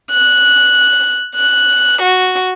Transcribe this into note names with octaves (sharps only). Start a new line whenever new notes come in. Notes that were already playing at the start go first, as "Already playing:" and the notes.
F#6
F#6
F#4